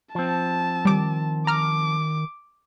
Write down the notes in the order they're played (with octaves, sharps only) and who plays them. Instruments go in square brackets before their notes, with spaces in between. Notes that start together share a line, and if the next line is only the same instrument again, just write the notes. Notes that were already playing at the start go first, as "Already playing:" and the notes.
[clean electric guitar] F3 C4 [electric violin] A5
[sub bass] D#3 [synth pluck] G3 D6
[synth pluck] A#5 F6 [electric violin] D6